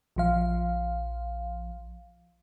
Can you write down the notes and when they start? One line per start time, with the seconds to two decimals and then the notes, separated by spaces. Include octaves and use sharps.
0.16 A#1 F3 F5